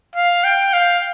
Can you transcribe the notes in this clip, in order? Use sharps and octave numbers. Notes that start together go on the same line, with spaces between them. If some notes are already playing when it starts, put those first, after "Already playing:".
F5
G5
F5